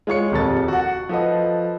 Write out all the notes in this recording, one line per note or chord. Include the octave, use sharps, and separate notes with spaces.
G#3 F4 C#5 C#7
D#1 F2 C3 A4 A#4 A6
F#4 F#5
F3 A4 B4 D#5